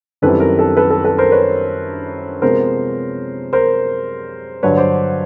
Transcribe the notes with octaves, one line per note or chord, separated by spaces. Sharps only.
F#2 D#3 G3 C4 E4 A4 B4
A#4
A4
A4 B4
A4
A4 B4
A#4 C5
B4 C#5
C3 F3 G#3 B3 A#4 C5
A#4 C5
G2 D3 F#3 B4 C#5
C5 D5